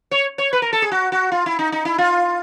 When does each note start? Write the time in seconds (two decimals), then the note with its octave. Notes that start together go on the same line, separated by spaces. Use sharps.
0.11 C#5
0.38 C#5
0.53 B4
0.62 A#4
0.73 A4
0.82 G#4
0.92 F#4
1.12 F#4
1.32 F4
1.46 E4
1.59 D#4
1.72 D#4
1.85 E4
1.98 F4